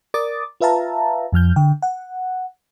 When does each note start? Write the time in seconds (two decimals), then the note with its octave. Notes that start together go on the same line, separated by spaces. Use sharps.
0.14 A#4 D5 D6 D#6 A6
0.61 F4 B4 E5 F5 A5 A#5
1.32 F2 F3 F6 G6
1.56 D3 G5
1.82 F#5